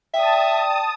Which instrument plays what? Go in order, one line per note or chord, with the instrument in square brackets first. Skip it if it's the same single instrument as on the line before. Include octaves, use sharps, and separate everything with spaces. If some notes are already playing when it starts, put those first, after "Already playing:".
[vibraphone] D5 G5 [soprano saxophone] E5 [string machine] A5 D#6